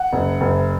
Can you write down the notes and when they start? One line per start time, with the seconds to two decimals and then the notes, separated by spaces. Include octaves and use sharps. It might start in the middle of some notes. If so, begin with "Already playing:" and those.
Already playing: F#5
0.13 F#1
0.41 F#1